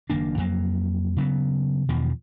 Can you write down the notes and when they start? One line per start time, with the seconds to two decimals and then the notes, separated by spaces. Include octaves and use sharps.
0.10 F#1 D#3 A#3 D4
0.38 F2 F#3 A#3
1.17 C#3 F#3 B3
1.88 E2 B2 D#3 F3